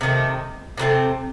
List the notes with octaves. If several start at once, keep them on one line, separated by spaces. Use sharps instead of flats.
C3 D#3 A3
C3 F#3 A3 C4